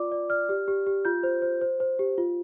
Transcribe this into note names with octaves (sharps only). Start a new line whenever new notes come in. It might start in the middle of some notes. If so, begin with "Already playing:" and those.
Already playing: F4 D5 D6
D5
D5 F6
G4
G4
G4
F4 G6
C5
C5
C5
C5
G4
F4